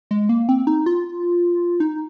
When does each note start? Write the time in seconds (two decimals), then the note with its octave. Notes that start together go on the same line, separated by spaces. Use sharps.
0.11 G#3
0.29 A#3
0.49 C4
0.67 D#4
0.86 F4
1.80 D#4